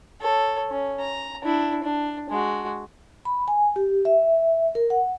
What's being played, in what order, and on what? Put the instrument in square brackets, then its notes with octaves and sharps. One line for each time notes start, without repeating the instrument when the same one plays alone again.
[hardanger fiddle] A4 C#5
C#4
A#5
D4 E4
D4
G#3 F#4
[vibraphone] B5
G#5
G4
E5
A#4
F#5